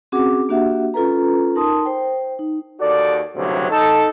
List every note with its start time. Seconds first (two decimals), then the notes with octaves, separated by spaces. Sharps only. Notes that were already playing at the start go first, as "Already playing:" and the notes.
0.12 C4 C#4 F#4 G#4 F#5 D6
0.49 A#3 D4 F#4 G4 E5 F#5
0.94 C#4 F4 A4 B4 A#5
1.55 D#4 A#4 A5 C6 D#6
1.85 C5 G5
2.39 D#4
2.80 D#2 F#4 A4 D5
3.36 F#1 D2 G2 C3 F#3
3.70 D#4 A4